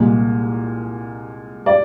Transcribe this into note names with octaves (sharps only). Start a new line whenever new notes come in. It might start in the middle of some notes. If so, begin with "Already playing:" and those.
Already playing: C2 A#2 G#3
D5